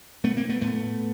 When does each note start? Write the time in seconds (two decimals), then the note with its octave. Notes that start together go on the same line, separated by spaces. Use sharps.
0.24 B2 A3 B3
0.37 A#3 C4
0.49 A3 B3
0.61 A2 A3 B3